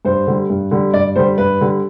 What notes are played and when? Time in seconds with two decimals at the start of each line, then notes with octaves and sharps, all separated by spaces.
0.05 G2 C5
0.27 D3 G3
0.50 G2
0.71 D3 G3
0.93 G2 D5
1.16 D3 G3 C5
1.38 G2 B4
1.61 D3 G3